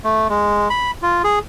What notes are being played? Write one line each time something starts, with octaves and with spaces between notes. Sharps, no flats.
A3
G#3
B5
F4
G#4